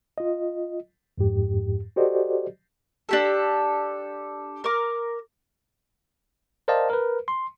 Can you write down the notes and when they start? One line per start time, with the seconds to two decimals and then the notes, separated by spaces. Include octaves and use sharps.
0.18 F4 D#5
1.18 F2 G#2 G4
1.96 F#4 G4 A4 C5 D5 D#5
3.09 D4 G4 A4
4.64 A#4 D6
6.68 A#4 C5 D5 D#5 F5 A5
6.90 A#4 B4
7.28 C6